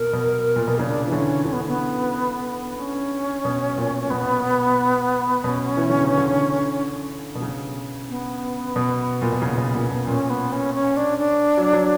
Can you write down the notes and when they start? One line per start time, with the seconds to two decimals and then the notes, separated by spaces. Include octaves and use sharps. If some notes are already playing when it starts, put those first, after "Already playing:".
Already playing: B2 A#4
0.13 B2
0.56 A#2
0.68 B2
0.79 C#3 D4
1.07 E3
1.12 D3 C#4
1.45 D3 C#4
1.53 B3
1.67 B3
2.78 C#4
3.45 B2
3.78 A#2
4.10 B2 B3
5.44 B2 C#4
5.77 E3
5.90 D3
6.04 C#3
6.17 D3
7.35 B2
7.42 C#3
8.09 B3
8.76 B2
9.22 A#2
9.32 B2
9.42 C#3
9.58 B2
9.75 A#2
9.91 B2
10.07 A#2 C#4
10.30 B3
10.52 C#4
10.74 C#4
10.97 D4
11.19 D4
11.57 F#3
11.73 F#3